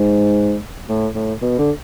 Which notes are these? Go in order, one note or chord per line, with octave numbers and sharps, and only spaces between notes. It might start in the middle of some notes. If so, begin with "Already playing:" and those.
Already playing: G#2
A2
A2
B2
D3